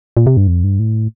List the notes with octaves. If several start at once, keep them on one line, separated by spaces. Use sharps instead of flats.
A#2
C3
G2
F2
G2
A2